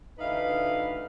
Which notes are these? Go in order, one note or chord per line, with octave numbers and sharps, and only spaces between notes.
D2 E3 D#4 B4 F5